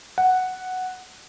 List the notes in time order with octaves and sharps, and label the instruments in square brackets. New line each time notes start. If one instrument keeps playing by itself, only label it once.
[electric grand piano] F#5